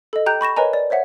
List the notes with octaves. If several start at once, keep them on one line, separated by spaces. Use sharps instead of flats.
A4 D#5
G4 G5 A#5 F#6 G6
B5 C#6 A#6 E7
A#4 B4 C#5 D#5 G#5 A#5
D5
C5 C#5 E5 F#5